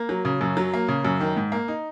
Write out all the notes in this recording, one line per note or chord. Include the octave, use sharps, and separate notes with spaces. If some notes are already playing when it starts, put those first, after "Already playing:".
Already playing: A#3
F#3
C#3
F#2
F#3
A#3
C#3
F#2
D#3
G#2
A#3
D#4